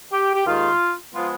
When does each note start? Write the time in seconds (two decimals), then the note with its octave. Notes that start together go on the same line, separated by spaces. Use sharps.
0.12 G4
0.35 G4
0.45 D#2 D#3 G#3 F4
1.13 F3 G#3 B3 F4